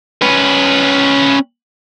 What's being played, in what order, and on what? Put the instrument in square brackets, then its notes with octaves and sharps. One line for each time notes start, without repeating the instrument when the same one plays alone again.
[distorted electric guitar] C#4 B4